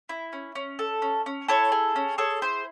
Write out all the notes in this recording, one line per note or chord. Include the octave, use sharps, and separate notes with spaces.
E4
C#4
C#4
A4
C#4
C#4
E4 A4 C#5
G#4
C#4
G#4 A4 C#5
E4 C5